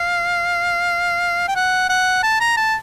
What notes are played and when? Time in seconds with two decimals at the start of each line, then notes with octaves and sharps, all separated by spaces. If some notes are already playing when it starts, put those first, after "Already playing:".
Already playing: F5
1.48 G5
1.56 F#5
1.89 F#5
2.23 A5
2.41 A#5
2.57 A5